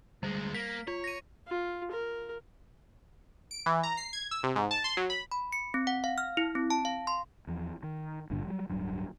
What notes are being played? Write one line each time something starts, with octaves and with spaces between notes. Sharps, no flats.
D2 G3 G#3
A#3 B6
F4 C#5
A#6 D#7
F4
A#4
D7
E3
A#5
C7
G#6
E6
C3
G#2
A5
C6
F#3
B5
B5
C#7
C4
F#5
F5
F6
E4
C4
A5
F5
C6
E2 F3
D#3
G#1 G2 A#2 D3
F#3 G3
D1 G2 F#3